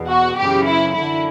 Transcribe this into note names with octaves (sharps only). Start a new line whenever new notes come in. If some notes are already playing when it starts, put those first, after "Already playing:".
Already playing: E2 B2
F#4
F#2 C#3 E3 G4
E4
F#2 D3 E4